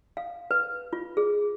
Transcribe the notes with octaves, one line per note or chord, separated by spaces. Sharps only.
F5
B4
F4
G#4